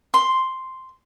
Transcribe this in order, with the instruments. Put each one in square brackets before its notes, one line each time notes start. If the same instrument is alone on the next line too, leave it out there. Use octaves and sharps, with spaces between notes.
[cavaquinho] C6